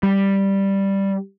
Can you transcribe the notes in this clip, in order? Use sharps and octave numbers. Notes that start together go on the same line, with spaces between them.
G3